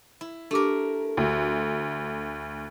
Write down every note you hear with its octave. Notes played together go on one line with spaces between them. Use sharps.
E4
A3 D4 G4 A#4 D6
D2